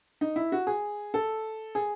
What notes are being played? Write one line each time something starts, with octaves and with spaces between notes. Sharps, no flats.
D#4
E4
F#4
G#4
A4
G#4